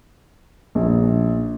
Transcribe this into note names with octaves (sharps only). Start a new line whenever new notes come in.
A#1